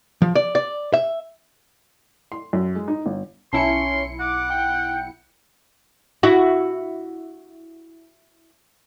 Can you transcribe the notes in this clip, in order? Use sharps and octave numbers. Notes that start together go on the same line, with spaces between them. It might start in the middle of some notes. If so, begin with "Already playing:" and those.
F3
D5
D5
E5
C6
F#2
G#3
D#4
G1
B1 C#4 E4 E5 G#5 A5 C6 C#7
F#5 D6
G5
E4 F#4